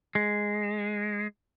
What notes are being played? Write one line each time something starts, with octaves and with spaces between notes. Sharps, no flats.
G#3